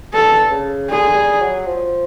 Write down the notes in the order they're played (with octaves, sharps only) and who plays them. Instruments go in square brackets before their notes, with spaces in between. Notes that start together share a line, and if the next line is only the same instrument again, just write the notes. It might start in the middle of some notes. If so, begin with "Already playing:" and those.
[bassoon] G2 [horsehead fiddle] A4
[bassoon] C#3
[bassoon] D3 [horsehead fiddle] G#4
[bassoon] G3
F#3
F3